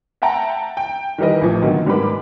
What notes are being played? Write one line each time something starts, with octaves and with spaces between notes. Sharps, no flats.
E5 F#5 G5 A5 A#5
G5
D#3 E3 G3 A#4 D#5
A1 F3
B2 D3 D#3 F#3 A#3
G#2 G3 A#3 B3 B5 D6